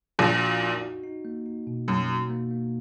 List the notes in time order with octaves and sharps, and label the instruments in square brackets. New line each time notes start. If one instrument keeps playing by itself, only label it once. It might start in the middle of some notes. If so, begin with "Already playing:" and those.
[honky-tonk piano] A#1 A#2 [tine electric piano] F#4
[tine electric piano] F#4
D#4
F#4
D#4
A#3
D#4
B2
[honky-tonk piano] F#2 [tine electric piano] B2
[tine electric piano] F#4
A#3
A#3